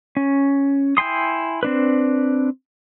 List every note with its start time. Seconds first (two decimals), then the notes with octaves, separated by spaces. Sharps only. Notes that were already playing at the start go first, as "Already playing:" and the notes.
0.17 C#4
0.97 E4 G5 G#5 C6 D#6
1.63 C4 D4 B4